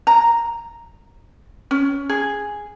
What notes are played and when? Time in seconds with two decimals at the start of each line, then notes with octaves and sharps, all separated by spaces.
0.07 A#5
1.71 C#4
2.09 G#4